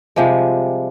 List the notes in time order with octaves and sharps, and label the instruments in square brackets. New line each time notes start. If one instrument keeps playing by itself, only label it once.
[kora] C3 F3 G3 G#3